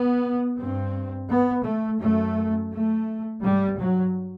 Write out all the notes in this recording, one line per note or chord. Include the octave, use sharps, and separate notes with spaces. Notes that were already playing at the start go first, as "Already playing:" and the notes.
Already playing: B3
G2 C4
B3
A3
F#2 A3
A3
G2 G3
F#3